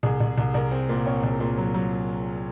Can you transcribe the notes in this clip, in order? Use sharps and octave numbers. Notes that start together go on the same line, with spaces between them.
C2 G#4
C2
C2
C2 A#4
C4
A#2
C4 C#5
C2
A#2
F#3
F#3